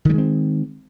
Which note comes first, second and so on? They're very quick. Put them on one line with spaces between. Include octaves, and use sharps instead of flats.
D#3 G3 G#3 C4